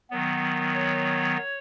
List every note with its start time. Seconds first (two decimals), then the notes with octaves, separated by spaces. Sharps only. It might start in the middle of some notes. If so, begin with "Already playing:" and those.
0.11 D#3 F#3 B3
0.74 C#5